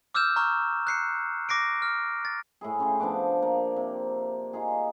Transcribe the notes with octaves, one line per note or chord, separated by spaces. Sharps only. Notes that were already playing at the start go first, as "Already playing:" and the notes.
D6 E6 F6 G6 E7
A#5 C#6 F6
F#6 C7 C#7
D6 A#6 C7 D7
F6
A6
A2 E4 G#4
C#3 C#4 G5 C6
F3 B3 D4 D6
A#3
C3
D#4 F4 G#4